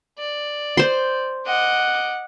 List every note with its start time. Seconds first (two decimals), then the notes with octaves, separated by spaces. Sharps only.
0.19 D5
0.77 C5 C6
1.47 D#5 F#5 D6